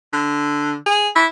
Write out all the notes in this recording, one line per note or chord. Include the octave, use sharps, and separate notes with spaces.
D3
G#4
E4